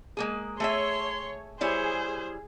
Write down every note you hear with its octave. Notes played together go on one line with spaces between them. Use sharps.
G#3 A#3 G#4
A3 G#4 C#5 E5 C6
G3 E4 G#4 C5 C#5